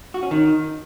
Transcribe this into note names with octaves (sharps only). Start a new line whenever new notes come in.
F#4
C#4
D#3